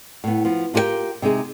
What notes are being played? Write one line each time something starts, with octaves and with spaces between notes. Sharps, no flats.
A2 B3
F3 B3
D4 F4 G4 A4 A#4 G5
C3 G#3 D#4 G#4